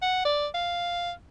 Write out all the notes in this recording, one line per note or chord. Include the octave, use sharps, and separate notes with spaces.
F#5
D5
F5